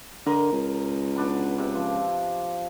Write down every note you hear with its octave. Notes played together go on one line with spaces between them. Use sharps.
D3 A#4 D#5
C#2
B2 D4 B5
C3
F3